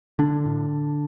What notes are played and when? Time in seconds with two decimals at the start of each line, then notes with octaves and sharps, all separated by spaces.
0.19 D3 D4
0.46 A2